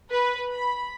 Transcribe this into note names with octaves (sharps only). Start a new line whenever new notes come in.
B4
B5